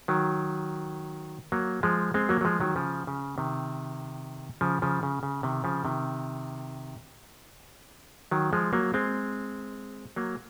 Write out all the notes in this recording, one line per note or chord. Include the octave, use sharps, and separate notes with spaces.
D#3 F#3
F#3 A#3
F3 G#3
G#3 C4
F#3 A#3
F#3
F3 G#3
D#3 F#3
C#3 F3
C#3
C3 D#3
C#3 F3
C#3 F3
C#3
C#3
C3 D#3
C#3 F3
C3 D#3
D#3 F#3
F3 G#3
F#3 A#3
G#3 C4
F#3 A#3